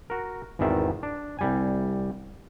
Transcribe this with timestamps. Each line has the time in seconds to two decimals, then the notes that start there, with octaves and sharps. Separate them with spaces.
0.10 F#4 A#4
0.59 G#1 E2 D#3 D5 E5
1.03 D4
1.39 C2 G3 G#5